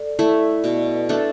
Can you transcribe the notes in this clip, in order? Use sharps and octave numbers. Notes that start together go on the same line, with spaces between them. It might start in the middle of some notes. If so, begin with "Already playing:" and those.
Already playing: A4 D5
A3 E4
B2 D5
B4
A3 D4 A4